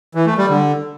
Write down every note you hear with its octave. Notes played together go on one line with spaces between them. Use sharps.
E3
A3
G3
D3